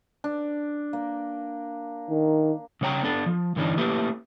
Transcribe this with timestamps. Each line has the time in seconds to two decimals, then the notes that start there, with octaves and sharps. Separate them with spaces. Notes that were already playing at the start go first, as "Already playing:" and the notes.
0.24 D4
0.93 A#3
2.10 D#3
2.81 C#3 G3 C#5 G5 A#5
3.03 B3 D4 A4
3.26 F3
3.56 G2 D3 E3 C4 C#4 D#4
3.78 A3 A#3 C#4 E4 G4 B4